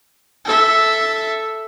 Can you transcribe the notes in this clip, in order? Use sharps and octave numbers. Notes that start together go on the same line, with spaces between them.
A4 E5